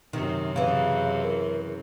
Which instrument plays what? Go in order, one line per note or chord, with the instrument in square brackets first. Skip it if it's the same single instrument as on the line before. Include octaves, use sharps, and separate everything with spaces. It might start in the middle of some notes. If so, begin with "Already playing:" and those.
[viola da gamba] F#2 C3 [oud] D#3
[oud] C#3 E3 [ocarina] F5
[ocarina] A#4